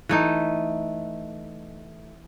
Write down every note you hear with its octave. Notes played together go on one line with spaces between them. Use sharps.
E3 A3 D#4